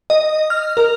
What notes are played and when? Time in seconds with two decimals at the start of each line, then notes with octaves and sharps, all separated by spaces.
0.10 D#5
0.50 F6
0.77 A#4